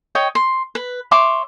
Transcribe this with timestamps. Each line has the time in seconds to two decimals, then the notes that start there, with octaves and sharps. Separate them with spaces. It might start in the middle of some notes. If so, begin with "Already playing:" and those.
0.15 C#5 D#5 G5
0.35 C6
0.75 B4
1.11 C#5 E5 C6 D6